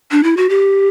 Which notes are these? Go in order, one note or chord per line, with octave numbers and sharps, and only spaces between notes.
D4
E4
F#4
G4